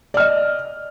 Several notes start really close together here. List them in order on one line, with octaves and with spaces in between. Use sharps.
D5 F6 D#5